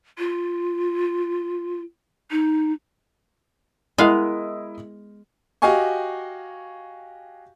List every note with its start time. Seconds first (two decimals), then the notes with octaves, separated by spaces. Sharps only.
0.18 F4
2.31 D#4
3.98 G#3 B3 E4 A#4 D#5 F5
5.62 F#4 G4 D#5 F5 G#5 C#6